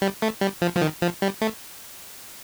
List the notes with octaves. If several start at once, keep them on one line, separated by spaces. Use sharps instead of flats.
G3
A3
G3
F3
F3
D#3
F3
G3
A3